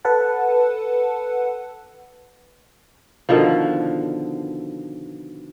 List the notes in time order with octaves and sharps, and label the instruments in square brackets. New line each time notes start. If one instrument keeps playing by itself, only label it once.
[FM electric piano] A4 B4 F#5 A5
[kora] B2 D3 D#3 F3